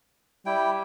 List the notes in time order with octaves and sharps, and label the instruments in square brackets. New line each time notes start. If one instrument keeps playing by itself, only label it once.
[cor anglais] G3 [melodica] E4 G5